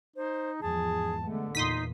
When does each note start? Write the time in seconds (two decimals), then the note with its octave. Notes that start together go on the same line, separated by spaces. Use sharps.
0.16 D#4 C5
0.62 E2 G#2 F3 G#4 A5
1.25 D3 G#3 A3 B3
1.55 E2 A#2 D#4 C6 D#6 B6